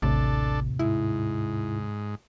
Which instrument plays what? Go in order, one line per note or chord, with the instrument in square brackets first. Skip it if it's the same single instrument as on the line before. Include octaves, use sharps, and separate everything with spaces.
[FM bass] A1 [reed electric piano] D#2 A2 C3 [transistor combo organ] D4 A4
[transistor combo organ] G#2 [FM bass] E4